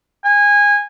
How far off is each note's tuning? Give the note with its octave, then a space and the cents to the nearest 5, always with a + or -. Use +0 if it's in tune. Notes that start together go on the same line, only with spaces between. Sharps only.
G#5 -20